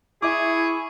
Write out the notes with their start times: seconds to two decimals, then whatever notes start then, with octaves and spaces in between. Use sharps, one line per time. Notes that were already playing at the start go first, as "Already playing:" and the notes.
0.22 E4 G#4 E5 G#5 C#6 D6